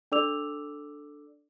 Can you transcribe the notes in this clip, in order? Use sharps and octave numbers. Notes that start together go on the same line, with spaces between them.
D4 A4 D5 D6 E6 F7